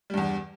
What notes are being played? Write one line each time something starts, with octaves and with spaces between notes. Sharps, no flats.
E2 G2 G3